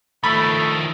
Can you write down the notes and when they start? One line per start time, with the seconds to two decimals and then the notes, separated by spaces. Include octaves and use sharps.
0.24 D#3 F3 A3 E5 B5 A6